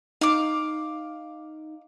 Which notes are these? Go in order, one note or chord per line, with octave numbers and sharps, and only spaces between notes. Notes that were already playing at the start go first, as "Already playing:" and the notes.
D#4 F5 D6